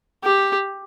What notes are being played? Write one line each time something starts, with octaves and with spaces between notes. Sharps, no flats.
G4